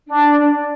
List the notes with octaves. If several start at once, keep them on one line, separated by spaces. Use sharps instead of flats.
D4